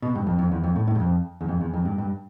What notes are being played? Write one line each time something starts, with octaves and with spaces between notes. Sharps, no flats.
B2
G2
F2
F2
E2
F2
A2
A2
G2
F2
E2
F2
E2
F2
G2
G2